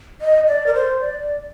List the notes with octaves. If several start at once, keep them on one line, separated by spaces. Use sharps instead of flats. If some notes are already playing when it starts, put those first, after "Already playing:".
D#5
D5
A#4
C5
D5